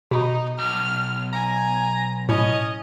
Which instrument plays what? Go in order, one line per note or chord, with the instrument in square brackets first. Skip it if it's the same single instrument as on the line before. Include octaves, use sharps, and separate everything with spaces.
[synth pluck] B2 [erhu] D#4
[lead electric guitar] B1 [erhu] F6
[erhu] G#5 [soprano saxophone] A#5
[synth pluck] A2 [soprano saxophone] C#4 [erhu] D#5